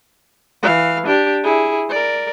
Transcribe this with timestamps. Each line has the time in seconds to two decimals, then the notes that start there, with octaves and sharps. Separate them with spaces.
0.63 E3 F5
1.06 D4 G4
1.43 E4 G#4
1.89 A#4 D5